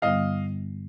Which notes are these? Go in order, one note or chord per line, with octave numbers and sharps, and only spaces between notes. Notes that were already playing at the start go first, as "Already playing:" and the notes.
G2 D3 G3 B3 E4 D#5 F5